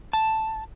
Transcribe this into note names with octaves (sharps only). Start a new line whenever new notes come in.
A5